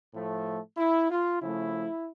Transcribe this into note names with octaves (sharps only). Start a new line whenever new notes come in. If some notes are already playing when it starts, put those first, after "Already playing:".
A2 F3 A3
E4
F4
C#3 F3 A3 E4